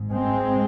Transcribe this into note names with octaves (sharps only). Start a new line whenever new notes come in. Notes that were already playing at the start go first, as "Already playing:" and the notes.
Already playing: G#1 G#2
G#3 C4